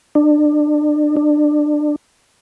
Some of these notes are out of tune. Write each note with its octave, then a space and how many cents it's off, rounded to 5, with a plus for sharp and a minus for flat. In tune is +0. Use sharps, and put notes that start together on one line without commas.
D4 +30
D4 +25